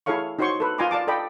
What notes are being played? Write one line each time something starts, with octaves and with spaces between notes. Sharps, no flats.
E4 G#4 A4 C#5 F5 C#6
D#4 F#4 C5 C#5 C6 C#6
A4 B4
F4 D#5 G#5 A#5 C6 D6
D5 F5 A5 D6
A4 D5 D#5 G5 B5